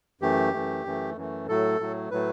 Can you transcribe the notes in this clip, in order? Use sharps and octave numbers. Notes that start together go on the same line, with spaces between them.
F#2 E3 A3 G4
F#2 E3 A3
F#2 E3 A3
F#2 E3 A3
A2 F#3 A3 A4
A2 F#3 A3
A2 F#3 A3 B4